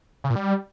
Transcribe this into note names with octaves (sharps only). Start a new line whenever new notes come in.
C#3
A#2
G3